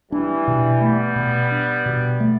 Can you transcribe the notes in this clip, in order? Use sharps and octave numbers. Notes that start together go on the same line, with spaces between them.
E3 G3 D4
B2
G3 A3 B3
B2
D4
B2
A3